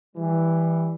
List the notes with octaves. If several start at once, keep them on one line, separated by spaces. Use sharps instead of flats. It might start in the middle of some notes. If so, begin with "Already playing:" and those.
E3 G3